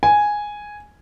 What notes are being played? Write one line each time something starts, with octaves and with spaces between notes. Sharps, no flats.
G#5